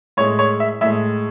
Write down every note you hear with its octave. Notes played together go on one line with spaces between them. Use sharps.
A2 G#3 C#5
C#5
E5
A2 G#3 E5